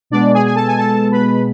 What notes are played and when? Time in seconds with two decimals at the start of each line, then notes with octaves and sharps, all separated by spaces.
0.10 B2 G#3 B3 D4 D5
0.34 G#4 G#5
0.46 G#5
0.55 A4 A5
0.67 G#5
0.77 A4 A5
1.12 B4 B5